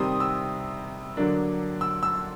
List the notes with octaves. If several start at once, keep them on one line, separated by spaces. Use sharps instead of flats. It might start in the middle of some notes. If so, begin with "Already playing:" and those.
Already playing: C3 D#3 G3 C4 D#6
E6
D3 F#3 A#3 D4
E6
E6